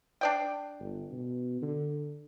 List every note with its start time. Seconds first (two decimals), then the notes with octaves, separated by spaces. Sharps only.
0.21 D4 D5 G5
0.79 G1
1.11 B2
1.62 D3